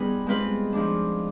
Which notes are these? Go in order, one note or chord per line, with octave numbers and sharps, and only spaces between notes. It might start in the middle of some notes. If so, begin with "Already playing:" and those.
Already playing: G3 B3 D#4 F4 G#4 B4
G#3 C4 F4 B4
F3 G#3 D4